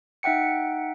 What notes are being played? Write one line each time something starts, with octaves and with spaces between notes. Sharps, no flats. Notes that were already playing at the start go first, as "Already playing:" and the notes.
D#4 E5 F#5 G5 C#7